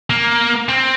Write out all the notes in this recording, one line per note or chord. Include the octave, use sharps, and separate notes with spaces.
A#3
C4